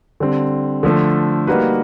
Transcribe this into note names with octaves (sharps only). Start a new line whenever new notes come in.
D3 G3 C4
D3 F3 A3
G3 A#3 D#4 F#4 B4